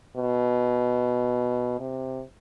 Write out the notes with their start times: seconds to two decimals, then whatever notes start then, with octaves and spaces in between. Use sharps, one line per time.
0.16 B2
1.79 C3